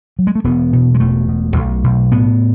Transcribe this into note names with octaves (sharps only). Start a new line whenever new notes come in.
F#3
G#3
A3
E1 B3
B2
G#3
E1 A3
B2
B1
B1
A2 B3